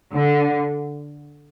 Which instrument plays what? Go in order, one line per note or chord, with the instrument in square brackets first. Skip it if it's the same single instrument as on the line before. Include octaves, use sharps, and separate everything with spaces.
[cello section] D3